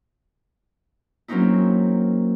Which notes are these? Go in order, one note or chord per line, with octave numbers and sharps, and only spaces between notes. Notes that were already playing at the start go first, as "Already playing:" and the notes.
F#3 A#3 C4 C#4 D#4 E4